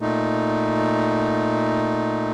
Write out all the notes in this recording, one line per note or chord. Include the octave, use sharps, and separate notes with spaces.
A#2 A3 D#4